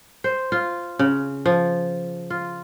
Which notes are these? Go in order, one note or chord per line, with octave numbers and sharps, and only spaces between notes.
C5
F4
C#3
F3
F4